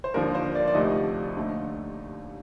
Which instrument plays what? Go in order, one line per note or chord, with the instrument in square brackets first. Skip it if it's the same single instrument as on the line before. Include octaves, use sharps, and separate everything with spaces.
[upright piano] C5
D#2 D3 F3 A#4
C5
D5
D5
D2 C3 F3 A3 D#4 D#5
D#2 D3 A3 D#4